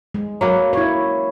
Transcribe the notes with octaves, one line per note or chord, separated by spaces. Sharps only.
G#3
F#3 A#3 B4
E4 C#5